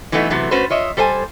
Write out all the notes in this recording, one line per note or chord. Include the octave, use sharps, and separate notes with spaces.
E3 F#3 A3 B3 D#4 F#5
C3 E3 F#3 A3 B3
A3 C#4 F#4 B4 C5
F4 C#5 D#5 E5
G3 A4 C5 E5 G#5